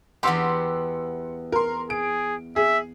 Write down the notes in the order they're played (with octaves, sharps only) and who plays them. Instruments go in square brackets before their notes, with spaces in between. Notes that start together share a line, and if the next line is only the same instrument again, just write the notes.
[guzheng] E2 B3 G4 [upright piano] F#5 C6 E6
[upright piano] A#4 C6
[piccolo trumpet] G#4 [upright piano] D7
[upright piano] G#4 [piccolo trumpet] E5